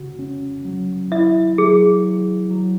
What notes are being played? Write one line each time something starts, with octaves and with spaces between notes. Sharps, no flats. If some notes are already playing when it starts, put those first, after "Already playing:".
Already playing: C#3 F#4
C#4
F#3
E4 E5
F#3 G#4
F#3
F#3